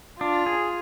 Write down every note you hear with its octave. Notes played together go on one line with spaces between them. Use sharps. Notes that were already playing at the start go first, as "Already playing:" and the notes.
D4 F4
G#4